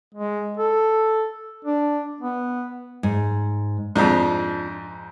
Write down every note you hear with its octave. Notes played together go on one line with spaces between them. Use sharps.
G#3
A4
D4
B3
G#2
F2 G#2 D4 F4